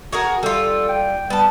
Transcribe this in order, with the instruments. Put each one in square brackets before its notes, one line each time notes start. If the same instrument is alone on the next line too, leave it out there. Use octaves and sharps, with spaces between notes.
[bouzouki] F#4 G#4 A#4
[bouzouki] G3 F4 [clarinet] A4
[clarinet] G5
[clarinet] G3 [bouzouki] B3 A5